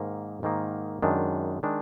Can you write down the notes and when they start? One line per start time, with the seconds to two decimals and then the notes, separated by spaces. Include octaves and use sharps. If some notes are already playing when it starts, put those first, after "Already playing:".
Already playing: G#2 D#3 A#3
0.43 G#2 D#3 A#3
1.02 F#2 D#3 G#3 D4
1.63 D#3 G#3 D4